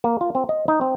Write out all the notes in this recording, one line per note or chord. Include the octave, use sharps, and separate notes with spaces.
A#3
F4
C4
D#5
D#4
C4